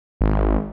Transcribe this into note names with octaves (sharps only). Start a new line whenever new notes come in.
G#1